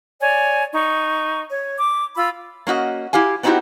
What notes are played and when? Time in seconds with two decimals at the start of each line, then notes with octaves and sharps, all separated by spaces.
0.20 C#5 D5 G#5
0.73 D#4 C#6
1.49 C#5
1.79 D6
2.16 F4 B5 E6
2.67 A#3 C#4 F#4 D#5
3.13 E4 G4 F5 G#5
3.43 B3 C4 D#4 E4 F#4 G4